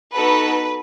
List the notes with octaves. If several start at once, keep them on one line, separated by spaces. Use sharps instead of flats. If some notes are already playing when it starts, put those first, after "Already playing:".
B3 D#4 F#4 A4 B4